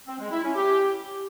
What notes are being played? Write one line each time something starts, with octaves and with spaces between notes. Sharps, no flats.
C4
G#3
E4
C#4
G4